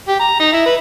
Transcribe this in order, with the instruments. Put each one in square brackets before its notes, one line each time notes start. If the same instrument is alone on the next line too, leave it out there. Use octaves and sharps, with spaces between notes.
[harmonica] G4
A#5
D#4
E4
B4